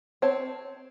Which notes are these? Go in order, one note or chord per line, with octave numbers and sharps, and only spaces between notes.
C4 C#5 A5